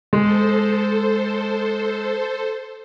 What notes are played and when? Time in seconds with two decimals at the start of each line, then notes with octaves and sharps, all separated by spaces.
0.13 G#3 A4 C5